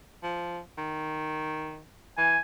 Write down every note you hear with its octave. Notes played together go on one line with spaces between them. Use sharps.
F3
D#3
E3 G#5